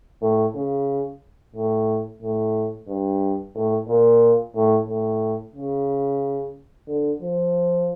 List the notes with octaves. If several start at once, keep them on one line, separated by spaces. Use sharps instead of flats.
A2
C#3
A2
A2
G2
A2
A#2
A2
A2
C#3
D3
F3